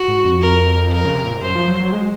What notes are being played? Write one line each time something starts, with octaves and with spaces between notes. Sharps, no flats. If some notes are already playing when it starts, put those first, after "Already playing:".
Already playing: F#4
G#2
F2
A#4
A#4
C#3
C3
A#2
G#2
F#2 C5
F3
F#3
F#3
G#3